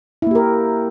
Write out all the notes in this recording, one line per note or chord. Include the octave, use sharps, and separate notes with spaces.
A#3 E4 G4 A#4